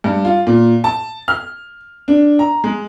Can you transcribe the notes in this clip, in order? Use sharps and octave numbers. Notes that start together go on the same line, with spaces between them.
G2
F4
A#2
A5
F6
D4
A#5
G#3